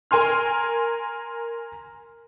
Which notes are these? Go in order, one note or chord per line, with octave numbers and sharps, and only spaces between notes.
A#4 G#5 C6 F6